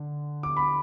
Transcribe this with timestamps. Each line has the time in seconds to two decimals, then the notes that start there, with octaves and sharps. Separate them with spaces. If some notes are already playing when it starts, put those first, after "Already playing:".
Already playing: D3
0.43 D6
0.57 B5